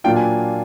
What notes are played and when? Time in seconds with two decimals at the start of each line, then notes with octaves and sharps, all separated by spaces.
0.04 A#2 F#3 A#3 D4 F4 G5
0.16 G#5